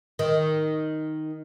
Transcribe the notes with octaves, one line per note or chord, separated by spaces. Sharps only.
D#3